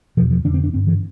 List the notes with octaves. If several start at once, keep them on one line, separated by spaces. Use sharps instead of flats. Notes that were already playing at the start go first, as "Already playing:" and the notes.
E2 B2 F3
F3
F2 D3 D4
C4
D4
G2 D3 C4
E3